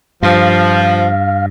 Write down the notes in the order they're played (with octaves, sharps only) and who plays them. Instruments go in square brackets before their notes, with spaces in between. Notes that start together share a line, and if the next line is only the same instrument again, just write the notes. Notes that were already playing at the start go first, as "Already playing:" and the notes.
[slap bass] G2 [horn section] F3 [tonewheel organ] F5